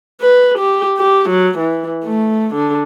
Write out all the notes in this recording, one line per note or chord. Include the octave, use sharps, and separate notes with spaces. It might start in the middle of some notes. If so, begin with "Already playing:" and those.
B4
G4
G4
F#3
E3
A3
D3